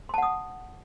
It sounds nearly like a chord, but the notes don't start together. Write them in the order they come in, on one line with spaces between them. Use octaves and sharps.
C6 A5 F#5 D#6